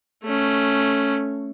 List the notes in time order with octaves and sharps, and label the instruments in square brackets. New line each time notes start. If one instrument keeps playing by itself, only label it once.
[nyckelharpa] A3 C#4